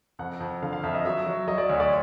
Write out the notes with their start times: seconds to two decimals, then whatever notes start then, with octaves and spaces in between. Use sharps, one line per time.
0.19 F2 F#5
0.40 F2
0.62 D3 F5
0.73 F5
0.83 F2 E5
0.94 D#5
1.05 F#3 E5
1.26 F#3
1.48 F#3 D#5
1.58 D5
1.69 D2 C#5
1.80 D5